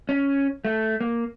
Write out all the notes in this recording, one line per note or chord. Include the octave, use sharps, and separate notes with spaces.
C#4
A3
A#3